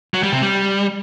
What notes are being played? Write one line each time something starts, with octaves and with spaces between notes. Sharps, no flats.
F#3
G3
C3
G3